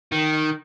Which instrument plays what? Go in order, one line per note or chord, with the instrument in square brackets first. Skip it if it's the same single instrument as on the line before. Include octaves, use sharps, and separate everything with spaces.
[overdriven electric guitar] D#3